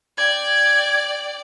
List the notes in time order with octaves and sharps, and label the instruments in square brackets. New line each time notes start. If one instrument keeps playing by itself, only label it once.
[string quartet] D5 G5 [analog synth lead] G#6